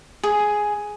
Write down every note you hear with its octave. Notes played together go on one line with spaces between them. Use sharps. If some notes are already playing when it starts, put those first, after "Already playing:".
G#4